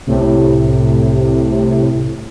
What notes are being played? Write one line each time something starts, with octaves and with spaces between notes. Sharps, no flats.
C2 A2 C3